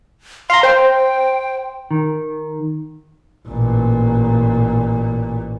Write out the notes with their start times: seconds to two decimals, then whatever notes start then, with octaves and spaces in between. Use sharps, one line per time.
0.50 F5 A#5 C6
0.63 C5 G5
1.91 D#3
3.48 A1 A#2